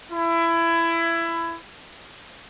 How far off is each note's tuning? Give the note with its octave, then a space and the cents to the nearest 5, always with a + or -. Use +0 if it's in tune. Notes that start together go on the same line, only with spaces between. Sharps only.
E4 +20